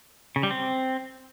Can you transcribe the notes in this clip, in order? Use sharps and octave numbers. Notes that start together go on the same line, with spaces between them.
C#3
G3
C4